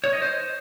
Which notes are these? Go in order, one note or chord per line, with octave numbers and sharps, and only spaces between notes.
C#5
D#5
C5